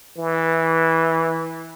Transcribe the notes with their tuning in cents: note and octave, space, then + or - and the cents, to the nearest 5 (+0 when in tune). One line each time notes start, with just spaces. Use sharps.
E3 -10